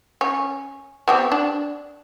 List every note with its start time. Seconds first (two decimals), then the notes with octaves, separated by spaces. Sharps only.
0.21 C#4
1.08 B3 C4 G4
1.32 D4